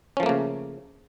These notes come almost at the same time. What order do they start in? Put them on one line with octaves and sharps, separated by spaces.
C#4 F3 A3 A#3 C#3